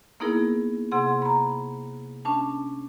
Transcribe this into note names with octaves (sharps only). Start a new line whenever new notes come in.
A#3 B3 D#4 E4 G#4 A#4
C3 G#4 F#5 C6
A#5 B5
C#4 D4 A5